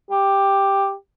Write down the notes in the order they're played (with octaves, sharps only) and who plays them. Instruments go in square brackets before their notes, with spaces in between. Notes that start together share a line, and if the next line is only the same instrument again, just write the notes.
[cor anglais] G4